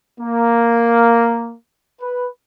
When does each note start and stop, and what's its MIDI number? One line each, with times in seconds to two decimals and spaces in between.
0.20 1.55 58
2.01 2.28 71